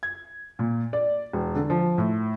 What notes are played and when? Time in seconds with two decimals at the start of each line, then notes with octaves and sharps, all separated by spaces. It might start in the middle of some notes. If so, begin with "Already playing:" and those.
0.03 G#6
0.59 A#2
0.93 D5
1.33 E1
1.55 D3
1.70 F3
1.98 A2